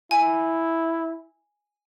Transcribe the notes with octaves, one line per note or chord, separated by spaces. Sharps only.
E4 G#5